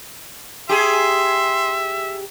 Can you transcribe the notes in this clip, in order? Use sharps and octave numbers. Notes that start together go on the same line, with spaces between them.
G4 G#4 E5 C6